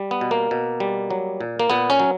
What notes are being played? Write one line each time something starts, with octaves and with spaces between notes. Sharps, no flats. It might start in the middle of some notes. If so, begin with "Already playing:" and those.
Already playing: G3
B3
B2
A#3
B2
G3
F#3
A#2
A#3
A#2 B3
C#4
F#3